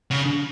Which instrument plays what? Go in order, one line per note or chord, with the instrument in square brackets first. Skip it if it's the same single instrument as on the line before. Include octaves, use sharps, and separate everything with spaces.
[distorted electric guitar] C#3